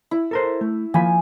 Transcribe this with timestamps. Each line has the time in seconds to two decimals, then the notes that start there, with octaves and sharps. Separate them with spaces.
0.11 E4
0.31 A4 A#4 C5
0.61 A3
0.94 F3 A#3 G#5 B5